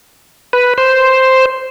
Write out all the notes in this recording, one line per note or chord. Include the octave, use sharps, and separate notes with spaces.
B4
C5